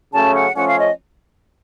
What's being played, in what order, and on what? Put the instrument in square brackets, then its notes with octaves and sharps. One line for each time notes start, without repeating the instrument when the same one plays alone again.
[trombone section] C#3 F#3 A3 C#4 [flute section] A5
[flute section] F#5
[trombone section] F3 A3 C#4 [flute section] F#5
[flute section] F5
D#5